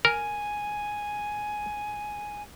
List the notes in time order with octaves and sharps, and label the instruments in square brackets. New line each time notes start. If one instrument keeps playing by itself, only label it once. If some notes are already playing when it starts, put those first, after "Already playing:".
[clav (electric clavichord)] A#4 [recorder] G#5